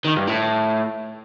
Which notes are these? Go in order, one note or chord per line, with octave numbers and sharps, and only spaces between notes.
D#3
G2
A2